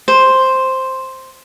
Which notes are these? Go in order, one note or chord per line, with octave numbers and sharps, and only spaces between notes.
C5